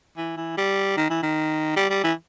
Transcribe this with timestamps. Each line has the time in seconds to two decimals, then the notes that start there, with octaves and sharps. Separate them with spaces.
0.17 E3
0.37 E3
0.57 G3
0.97 D#3
1.10 E3
1.22 D#3
1.76 G3
1.90 G3
2.04 E3